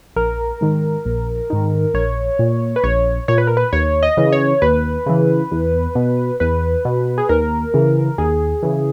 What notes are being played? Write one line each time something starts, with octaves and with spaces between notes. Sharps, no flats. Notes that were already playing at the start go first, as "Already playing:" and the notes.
A#1 A#4
G#2 D#3
A#1
G#2 D#3
A#1 C#5
A#2
B4
A#1 C#5
A#2 C#5
B4
A#4
B4
D#2 C#5
D#5
C#3 E3
C#5
D#2 B4
C#3 E3
E2
B2
E2 B4
B2
G#4
D#2 A#4
C#3 E3
D#2 G#4
C#3 E3